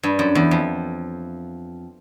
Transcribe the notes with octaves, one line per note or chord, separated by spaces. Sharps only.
G2
F#2
E2
F2